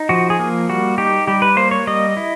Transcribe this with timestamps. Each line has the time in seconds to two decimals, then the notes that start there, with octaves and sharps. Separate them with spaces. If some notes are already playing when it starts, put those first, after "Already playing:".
Already playing: D#4
0.09 F3 F#4
0.30 G#4
0.39 A#3
0.69 G3 F#4
0.98 D#4 G4
1.27 G3 G4
1.42 B4
1.57 A#3 C5
1.71 C#5
1.87 G3 D#5
2.17 E4